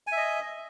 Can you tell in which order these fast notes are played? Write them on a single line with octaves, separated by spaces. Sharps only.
G#5 E5 D#5